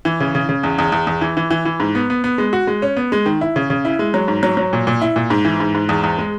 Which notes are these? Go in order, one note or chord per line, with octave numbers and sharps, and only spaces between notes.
E3
C#3
C#3
C#3
E2
E2
E2
E2
E3
E3
E3
E3
G#2
B3
B3
B3
G#3
F#4
G#3
C#4
B3
G#3
D#3
E4
C#3
C#3
E4
G#3
F#3
G#2
F#3
F#3
A#2
A#2
E4
A#2
G#2
E3
G#2
G#2
E2
E2
G#3